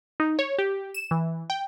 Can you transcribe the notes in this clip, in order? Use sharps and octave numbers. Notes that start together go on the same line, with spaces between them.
D#4
C#5
G4
E7
E3
G5